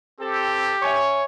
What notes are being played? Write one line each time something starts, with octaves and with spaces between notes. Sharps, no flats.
C4 G4 A4
C#5 E5 G#5 C#6